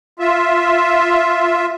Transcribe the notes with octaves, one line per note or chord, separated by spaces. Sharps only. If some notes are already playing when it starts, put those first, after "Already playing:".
F4 E5